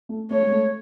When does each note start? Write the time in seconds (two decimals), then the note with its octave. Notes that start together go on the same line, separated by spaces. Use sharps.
0.09 A3
0.30 A3 C#5
0.42 G#3
0.51 A3